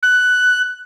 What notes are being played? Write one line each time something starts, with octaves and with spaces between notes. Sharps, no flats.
F#6